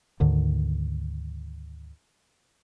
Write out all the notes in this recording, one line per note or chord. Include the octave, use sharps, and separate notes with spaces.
D2 G#2 D3 D#3